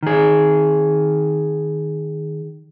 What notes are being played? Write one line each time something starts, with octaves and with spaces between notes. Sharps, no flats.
D#3 G#4